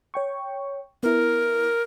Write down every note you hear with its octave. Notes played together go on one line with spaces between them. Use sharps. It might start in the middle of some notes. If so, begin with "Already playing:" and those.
C#5 G5 C#6
B3 E4 A#4